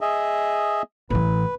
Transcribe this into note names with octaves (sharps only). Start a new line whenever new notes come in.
G#4 D#5 E5
A1 E3 B4